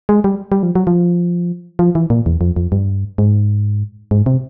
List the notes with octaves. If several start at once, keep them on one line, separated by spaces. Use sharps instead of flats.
G#3
G3
G3
F3
F#3
F3
F3
E3
A#2
E2
F2
F2
G2
G#2
G#2
C3